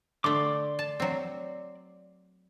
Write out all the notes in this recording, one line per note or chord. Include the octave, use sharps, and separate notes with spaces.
D3 A3 D5 C6 D6
A5
F#3 C4